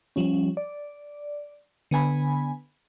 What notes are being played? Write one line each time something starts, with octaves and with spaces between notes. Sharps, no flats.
F3 G3 C#4
D5
D3 B3 G#5 B5